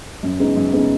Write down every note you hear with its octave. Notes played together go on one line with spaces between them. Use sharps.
F#2
C#3 G#3 B3 D#4
F#2
C#3 G#3 B3 D#4